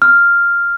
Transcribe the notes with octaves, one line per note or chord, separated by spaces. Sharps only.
F6